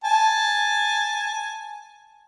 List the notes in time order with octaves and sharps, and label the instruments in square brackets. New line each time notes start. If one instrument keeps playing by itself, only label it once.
[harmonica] G#5 A5